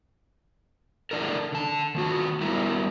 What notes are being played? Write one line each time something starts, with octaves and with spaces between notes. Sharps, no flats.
A3 D4 E4 A4 A#4
D3 A5
D#3 A#3 F4 F#4
G3 B3 E4 F#4 A#4